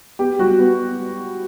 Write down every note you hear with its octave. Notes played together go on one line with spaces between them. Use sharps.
B3 G4
G3 F#4
B3